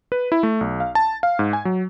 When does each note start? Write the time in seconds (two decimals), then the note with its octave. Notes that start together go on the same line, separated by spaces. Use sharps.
0.12 B4
0.32 E4
0.43 A3
0.61 B1
0.80 F5
0.95 A5
1.23 F5
1.39 G#2
1.53 G#5
1.65 F#3